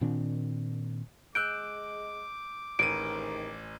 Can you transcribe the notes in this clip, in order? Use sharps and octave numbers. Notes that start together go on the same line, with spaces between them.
A#2 D#3 C4 D4
G#3 D6 E6 F#6 G6 D7
A1 G#2 C3 D#3 D7 D#7